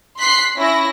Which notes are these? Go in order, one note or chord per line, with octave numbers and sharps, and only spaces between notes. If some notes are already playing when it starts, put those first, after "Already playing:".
C6 F#6 B6 C7
C#4 E4 A#6